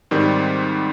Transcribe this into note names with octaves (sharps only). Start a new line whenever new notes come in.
G#2 D#3 G3 C4